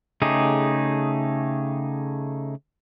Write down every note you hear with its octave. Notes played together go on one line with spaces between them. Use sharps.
C#3 A3 D#4 G4 G#4